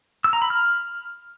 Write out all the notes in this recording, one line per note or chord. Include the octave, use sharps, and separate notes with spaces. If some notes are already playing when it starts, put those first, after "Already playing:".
E6
A#5
B5
F6